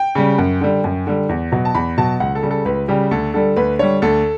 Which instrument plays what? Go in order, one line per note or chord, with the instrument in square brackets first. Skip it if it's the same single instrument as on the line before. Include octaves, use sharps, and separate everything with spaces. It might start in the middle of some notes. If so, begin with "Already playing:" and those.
Already playing: [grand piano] G5
C#3 G3
F#2
D3 G3
F#2
D3 G3
E2
B2 F#3
A5
E2 B5
B2 F#3 A5
C#2 F#5
A4
C#3 G3
A4
C#2 B4
C#3 G3 G4
D2 A4
D3 G3 A4
D2 B4
D3 G3 C#5
D2 A4